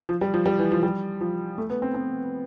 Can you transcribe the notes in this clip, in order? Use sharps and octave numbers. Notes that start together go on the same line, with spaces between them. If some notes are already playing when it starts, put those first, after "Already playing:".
F3
G3
F3
G3
E3
F3
G3
F3
A3
B3
C4
C4